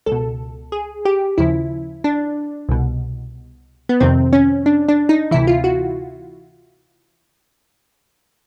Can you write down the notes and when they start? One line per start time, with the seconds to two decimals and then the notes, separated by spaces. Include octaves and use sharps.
0.06 C#2 A4
0.12 B2
0.72 G#4
1.05 G4
1.38 D#2 C#3 F3 E4
2.04 D4
2.69 C2 B2
3.89 B3
4.00 F2 C3 D#3 C4
4.33 C#4
4.66 D4
4.89 D4
5.09 D#4
5.31 D2 C3 E3 E4
5.47 F4
5.64 F#4